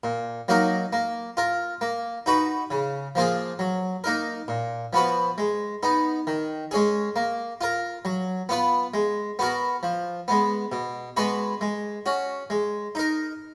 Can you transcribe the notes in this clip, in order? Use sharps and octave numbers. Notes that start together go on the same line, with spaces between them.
A#2
F#3 A#3 D#4 A#4
A#3
F4 A#4
A#3
D#4 F#4 B4
C#3
F3 A#3 F4 G#4
F#3
A#3 D#4 A#4
A#2
F3 B3 F#4 B4
G#3
B3 D#4
D#3
G#3 C#4 G#4
A#3
F4 A#4
F#3
B3 F4 B4
G#3
B3 F#4 A#4
F3
G#3 B3
B2
G#3 B3 F#4 B4
G#3
C#4 F#4
G#3
D#4 A#4